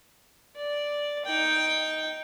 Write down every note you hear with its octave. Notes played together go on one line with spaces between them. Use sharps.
D5
D#4 G5